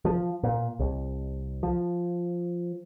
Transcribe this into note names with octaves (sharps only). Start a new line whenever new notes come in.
F3
A#2
C2
F3